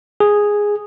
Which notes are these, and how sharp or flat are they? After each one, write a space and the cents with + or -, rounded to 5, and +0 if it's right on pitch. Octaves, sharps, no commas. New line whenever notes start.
G#4 -5